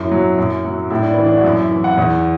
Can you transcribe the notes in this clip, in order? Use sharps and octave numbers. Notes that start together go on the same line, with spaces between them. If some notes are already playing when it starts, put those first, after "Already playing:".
Already playing: F#2 E4
F#3
F#2
F#3
A2 E4
D4
E3 B3
D4
F#4
F#2 E4
E5
E3
F#5
E2